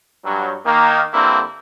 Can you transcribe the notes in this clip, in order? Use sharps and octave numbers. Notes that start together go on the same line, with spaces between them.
G2 F#3
D#3 A#3
G2 D3 A#3 C4 E4